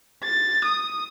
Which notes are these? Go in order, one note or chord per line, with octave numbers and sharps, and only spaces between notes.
A6
D#6